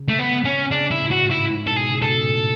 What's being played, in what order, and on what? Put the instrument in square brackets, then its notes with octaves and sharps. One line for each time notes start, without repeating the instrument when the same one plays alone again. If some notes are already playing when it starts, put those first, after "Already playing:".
Already playing: [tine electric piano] C#3
[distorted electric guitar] A3
B3
C#4
[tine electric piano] C#3 [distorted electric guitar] D4
[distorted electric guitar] E4
[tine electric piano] A2
[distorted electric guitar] F#4
[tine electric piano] G#2
[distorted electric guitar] E4
[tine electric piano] G#2
[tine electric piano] B2 [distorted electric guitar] A4
[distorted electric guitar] G#4
[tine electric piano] C#3
[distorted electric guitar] A4
[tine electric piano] B2
A2